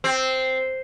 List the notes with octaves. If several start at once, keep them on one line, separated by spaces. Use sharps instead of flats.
C4